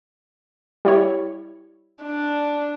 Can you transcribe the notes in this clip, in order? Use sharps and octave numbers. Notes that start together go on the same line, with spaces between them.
G3 E4 C#5
D4